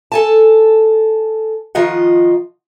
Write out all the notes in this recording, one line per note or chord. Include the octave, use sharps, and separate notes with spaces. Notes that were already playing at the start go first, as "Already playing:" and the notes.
A4 G#5 A5
D#3 F3 F4 D#5 F#5